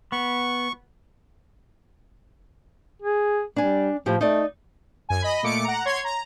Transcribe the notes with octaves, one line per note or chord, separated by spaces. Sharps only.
B3 C#6
G#4
G3 D4 G#5
A2 F3 G4
A3 D#4 D5
F#2 G#5
D#5 B5
A#2 A3 D6 C#7 D7
F#5 A#5
C#5 C6 G#6
A#5